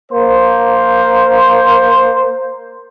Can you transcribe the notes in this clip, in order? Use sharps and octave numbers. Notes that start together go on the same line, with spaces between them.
A#3 C5